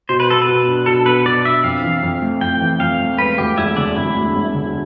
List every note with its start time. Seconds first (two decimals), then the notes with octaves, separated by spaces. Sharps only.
0.09 B2 C5
0.20 B4
0.28 B3 A4
0.42 B4
0.48 B2
0.68 D4
0.86 B2 A4
1.06 B3 B4
1.25 B2 D5
1.45 D4 E5
1.64 F2 F5
1.83 E3
2.03 F2
2.22 A3
2.41 F2 G5
2.61 E3
2.80 F2 F5
3.00 A3
3.18 E1 B4
3.38 D2 G4
3.58 E1 E4
3.77 D3 D4
3.96 E1 E4
4.15 D2
4.35 E1
4.55 D3